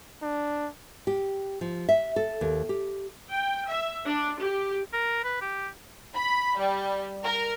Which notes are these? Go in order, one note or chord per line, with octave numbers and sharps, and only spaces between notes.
D4
G4
F3
E5
A4
D#2
G4
G5
E5
D4
G4
A#4
B4
G4
B5
G3
A#4